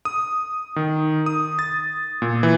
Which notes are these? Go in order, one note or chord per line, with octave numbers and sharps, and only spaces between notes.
D#6
D#3
D#6
A6
A#2
E3